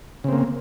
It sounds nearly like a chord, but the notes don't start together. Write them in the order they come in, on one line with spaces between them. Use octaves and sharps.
C#3 C4 A#3